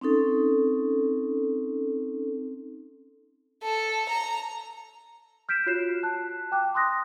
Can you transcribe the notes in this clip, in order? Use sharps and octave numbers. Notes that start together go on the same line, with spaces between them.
C4 C#4 D#4 A4
A4
A#5
F6 G6 B6 D7 E7
F4 F#4 C#5 F#6 C7 E7
A5 F#6
G5 D6 F#6
C6 D#6 F#6 A#6